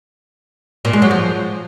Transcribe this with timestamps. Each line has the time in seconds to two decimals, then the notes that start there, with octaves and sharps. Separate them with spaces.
0.85 A#2
0.93 G#3
1.02 F#3
1.11 F3